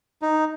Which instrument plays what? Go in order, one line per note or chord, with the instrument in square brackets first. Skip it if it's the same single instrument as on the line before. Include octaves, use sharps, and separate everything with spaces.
[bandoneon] D#4